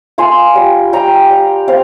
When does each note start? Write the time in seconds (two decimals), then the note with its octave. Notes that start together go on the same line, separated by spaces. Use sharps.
0.18 F4 G#5 C6
0.55 G3
0.93 G3 G5 A#5
1.30 G3
1.68 C4 F5